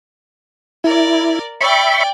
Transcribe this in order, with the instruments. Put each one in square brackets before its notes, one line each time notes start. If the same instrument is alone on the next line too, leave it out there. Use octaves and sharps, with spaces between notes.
[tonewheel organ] E4 [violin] A#4 D5
[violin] D5 G5 [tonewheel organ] E5 B5 C#6